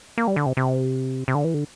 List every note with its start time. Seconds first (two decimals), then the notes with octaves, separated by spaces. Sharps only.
0.18 A#3
0.28 G3
0.36 D3
0.46 C3
0.57 C3
1.28 C3
1.35 D3
1.45 E3
1.54 D3